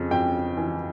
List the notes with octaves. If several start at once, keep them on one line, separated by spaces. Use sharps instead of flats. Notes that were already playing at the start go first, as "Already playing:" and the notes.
Already playing: F2 C#3
F2 G5
E3